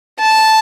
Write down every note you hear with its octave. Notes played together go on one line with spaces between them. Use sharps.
A5